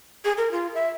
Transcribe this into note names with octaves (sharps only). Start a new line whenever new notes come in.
G#4
A#4
F4
E5